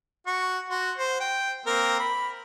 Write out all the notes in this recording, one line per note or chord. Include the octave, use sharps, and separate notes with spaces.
F#4 C#6
F#4 C6
C5
G5
A#3 C4 A#4
B5